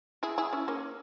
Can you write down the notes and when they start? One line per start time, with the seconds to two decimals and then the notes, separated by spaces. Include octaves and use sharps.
0.23 E4 G#4
0.38 E4 G#4
0.53 C#4 E4
0.68 A#3 C#4